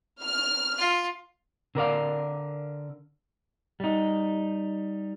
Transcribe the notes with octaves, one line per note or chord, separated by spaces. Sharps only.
F6
F4
D3 A#4 D5 F5
G3 D#4